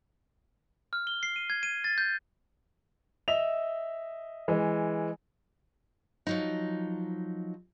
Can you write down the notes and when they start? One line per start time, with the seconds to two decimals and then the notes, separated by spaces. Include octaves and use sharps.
0.93 F6
1.07 G7
1.23 C7
1.36 D#7
1.50 G#6
1.63 D#7
1.84 A6
1.98 G6
3.28 D#5 E5 F7
4.48 E3 G#3
6.27 F3 F#3 D#4